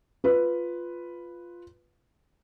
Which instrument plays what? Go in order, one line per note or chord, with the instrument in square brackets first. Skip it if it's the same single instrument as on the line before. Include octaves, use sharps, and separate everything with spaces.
[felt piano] F4 B4